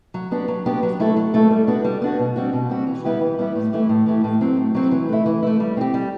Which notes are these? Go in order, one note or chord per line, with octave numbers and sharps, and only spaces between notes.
F#3
B3 D4 G4
F#3
B3 D4 G4
F#3
A3 E4 A4
F#3
A3 E4 A4
G3
B3 D4 F#4
G3
B3 D4 F#4
B2
G3 C4 F#4
B2
G3 C4 F#4
E3
G3 B3 E4 G4
E3
G3 B3 E4 G4
A2
E3 A3 E4 G4
A2
E3 A3 E4 G4
A2
F#3 C4
A2
F#3 C4
E3
A3 E4
E3
A3 E4
G3
C4 G4
G3